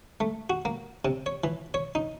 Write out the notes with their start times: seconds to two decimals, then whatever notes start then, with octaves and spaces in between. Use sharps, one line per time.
0.20 A3
0.50 F#4
0.65 A#3
1.05 C3
1.26 C#5
1.44 E3
1.74 C#5
1.95 D#4